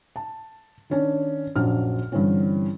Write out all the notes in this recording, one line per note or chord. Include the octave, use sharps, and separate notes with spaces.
A5
D#3 C#4 D4
A#1 F#2 F#3 D4 F6
G2 D3 E3 C4 C#4